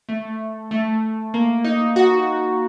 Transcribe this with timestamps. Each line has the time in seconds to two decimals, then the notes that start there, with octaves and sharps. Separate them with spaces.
0.09 A3
0.71 A3
1.34 A#3
1.64 D#4
1.96 F#4